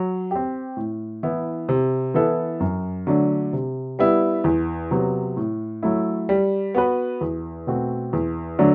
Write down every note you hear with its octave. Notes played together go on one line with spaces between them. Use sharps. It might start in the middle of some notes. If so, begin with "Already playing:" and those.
Already playing: F#3
C4 G4
A2
E3 B3 E4
C3
E3 B3 E4 A4
F#2
D3 F#3 A3 D4
C3
G3 B3 E4
E2
C3 F#3 B3
A2
F#3 A3 E4
G3
B3 F#4 B4
E2
B2 A3 C4 F#4
E2
D3 F#3 A3 D4